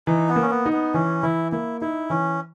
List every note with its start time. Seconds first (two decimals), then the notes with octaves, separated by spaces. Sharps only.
0.07 E3 D#4
0.29 B3
0.36 A#3
0.42 C#4
0.50 B3
0.66 D#4
0.73 B3
0.94 E3 C#4
1.23 E3 E4
1.52 A#3 E4
1.81 D#4 E4
2.10 E3 C#4